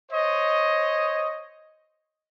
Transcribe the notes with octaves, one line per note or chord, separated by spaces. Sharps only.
C5 C#5 D#5